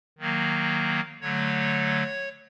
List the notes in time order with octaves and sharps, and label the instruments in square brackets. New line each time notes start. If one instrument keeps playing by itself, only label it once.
[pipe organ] D#3 F#3 A#3
D3 F#3 A3 C#5